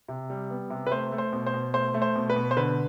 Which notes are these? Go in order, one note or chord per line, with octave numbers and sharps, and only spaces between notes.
C3
G3
B3
C3
B4
A3 C5
A3
C5
B2
C5
B2
A3 C5
A3
C5
B2
B4
B2
C5
D3 B4